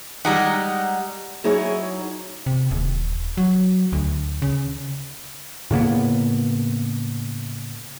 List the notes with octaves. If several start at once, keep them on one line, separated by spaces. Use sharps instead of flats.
G3 G#3 D#4 F#5 A#5
F#3 D#4 E4 G#4 C#5
C3
D#1
F#3
D2
C#3
A2 C#3 A#3 B3